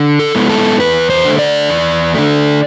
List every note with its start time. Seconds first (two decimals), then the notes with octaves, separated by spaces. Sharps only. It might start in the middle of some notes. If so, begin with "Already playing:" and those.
Already playing: D3
0.19 A4
0.35 G#3 B3 E4
0.50 A4
0.79 E2 B4
1.10 C5
1.25 D3 A3
1.39 D5
1.69 E2
2.14 D3 A3